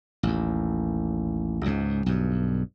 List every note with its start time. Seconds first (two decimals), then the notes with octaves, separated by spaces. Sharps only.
0.23 A1 D#2
1.66 C#2 G#2
2.06 B1 G2